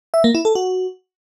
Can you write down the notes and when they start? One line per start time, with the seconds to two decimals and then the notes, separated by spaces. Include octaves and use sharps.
0.14 E5
0.24 A#3
0.35 E4
0.45 A4
0.55 F#4